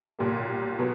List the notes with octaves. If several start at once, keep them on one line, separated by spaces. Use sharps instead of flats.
B1 A#2 G3 A#3
B2 F#3 B3